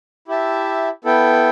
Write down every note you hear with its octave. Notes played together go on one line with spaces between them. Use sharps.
E4 G4 E5 A5
B3 E4 A4 G5